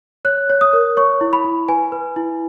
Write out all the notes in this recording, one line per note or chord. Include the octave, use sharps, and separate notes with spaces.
C#5 F#6
C#5
D#6
A#4
C#5 C#6
E4
B5
E4
B4 G#5
B4
E4